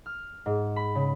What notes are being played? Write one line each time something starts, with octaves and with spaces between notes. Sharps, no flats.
F6
G#2
B5
C#3